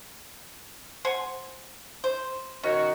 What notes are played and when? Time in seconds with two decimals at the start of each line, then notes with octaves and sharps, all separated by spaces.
1.05 C5 F#5 G#5
2.04 C5
2.63 D#3 C#4 F#4 C#5